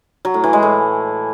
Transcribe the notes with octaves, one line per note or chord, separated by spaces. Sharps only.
F#3
A2
E3
G#3
A2